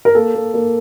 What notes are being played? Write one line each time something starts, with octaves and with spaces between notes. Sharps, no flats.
A#4
A#3 A4
A#3
A#3